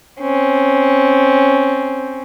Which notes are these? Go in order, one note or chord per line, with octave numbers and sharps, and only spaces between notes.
C4 C#4